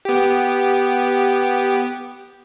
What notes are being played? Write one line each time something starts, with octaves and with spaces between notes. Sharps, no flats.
B3 G4